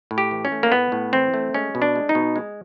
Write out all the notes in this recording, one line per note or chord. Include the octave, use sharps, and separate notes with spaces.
A2
G4
E3
C#4
A3
A#3
A2 B3
A2
E3 C4
A3
G#3 C#4
B2
D4
G#3
D#4
B2
G#3